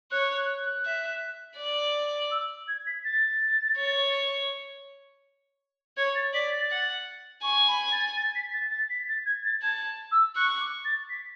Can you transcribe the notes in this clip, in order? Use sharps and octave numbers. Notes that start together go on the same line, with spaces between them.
C#5 F#6
F#6
F#6
E5
D5
E6
G#6
B6
A6
C#5
C#5 G#6
A6
D5 B6
A6
F#5
G#5 C#6
B5
A6
A6
B6
A6
A6
B6
A6
G#6
A6
A5 G#6
E6
C#6 F#6
D6
A6
B6